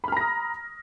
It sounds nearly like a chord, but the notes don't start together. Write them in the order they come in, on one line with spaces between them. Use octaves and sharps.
B5 F6 A#5 A#6 D#6